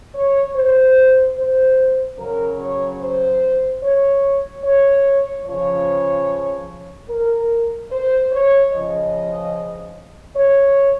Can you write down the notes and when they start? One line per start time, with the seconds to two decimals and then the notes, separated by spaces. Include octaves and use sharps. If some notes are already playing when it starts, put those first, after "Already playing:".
0.14 C#5
0.55 C5
1.36 C5
2.18 C#3 F#3 A#4
2.59 C#5
3.00 C5
3.82 C#5
4.64 C#5
5.45 C#3 F3 C#5
7.09 A#4
7.90 C5
8.32 C#5
8.72 C#3 F3 D#5
10.36 C#5